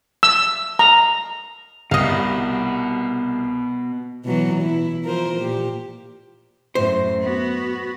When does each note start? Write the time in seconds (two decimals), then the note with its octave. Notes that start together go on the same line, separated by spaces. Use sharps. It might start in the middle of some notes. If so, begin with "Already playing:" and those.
0.23 E6
0.79 A#5
1.91 C2 B2 D#5 F5
4.25 B2 E3 F#3
4.63 E4
5.04 F3 A#4 C5
5.37 A#2 G4
6.75 F#2 A2 C5
7.21 B3 F#4